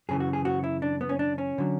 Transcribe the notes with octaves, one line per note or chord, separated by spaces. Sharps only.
F#2 C#3 E3 G#4
F#4
G#4
F#4
E4
D4
B3
C#4
D4
C#4
D3 F#3